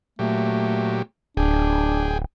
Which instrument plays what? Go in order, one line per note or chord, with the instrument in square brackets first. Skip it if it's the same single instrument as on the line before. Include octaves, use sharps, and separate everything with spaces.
[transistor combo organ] A#2 F#3 G4 [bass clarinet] A3
[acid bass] D1 [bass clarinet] D4 [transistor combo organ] G#4 G5